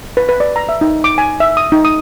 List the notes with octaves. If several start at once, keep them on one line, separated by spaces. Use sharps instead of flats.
B4
B4
D5
A#5
E5
D#4
D6
G#5
E5
D#6
D#4
D#6